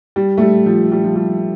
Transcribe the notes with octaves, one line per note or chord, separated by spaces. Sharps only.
G3
A3
G3
F3
G3
F3
G3